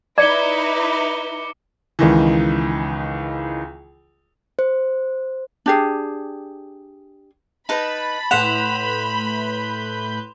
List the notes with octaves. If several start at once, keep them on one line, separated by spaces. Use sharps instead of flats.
D#4 E4 B4 D5 D6 C#7 G7
C#2 D#3 E3
C5
D4 G4 G#4
D#4 B4 A5 B5
A2 B4 F#5 C6 G6 E7 F7